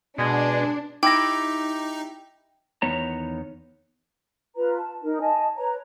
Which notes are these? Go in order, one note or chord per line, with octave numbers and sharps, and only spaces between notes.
B2 G#3 D4
D#4 E4 G4 G5 D6 A#6
E2 D#3 B3 C#5 A#5
F4 B4 A#5
A5
D#4 A#4
D#5 G#5 A5
B4 C#5 A#5